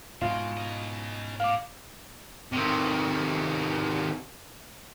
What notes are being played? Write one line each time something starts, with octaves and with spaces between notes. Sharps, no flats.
G#2 B2 G#3 F4
C#4 D#5
A2 F5 D6
C3 D#3